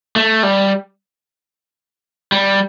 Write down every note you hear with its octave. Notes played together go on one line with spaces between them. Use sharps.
A3
G3
G3